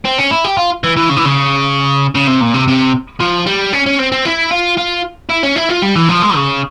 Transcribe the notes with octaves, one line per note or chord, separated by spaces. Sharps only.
C4
C#4
E4
G4
F4
E3
E3
C#3
E3
C#3
C#3
C3
A#2
C3
C3
F3
G3
C#4
C#4
C4
C4
E4
F4
F4
E4
C#4
E4
F4
G3
E3
F3
G#3
C#3